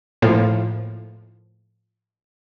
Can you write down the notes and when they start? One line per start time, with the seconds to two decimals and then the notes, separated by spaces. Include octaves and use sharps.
0.22 A2 F3 A#3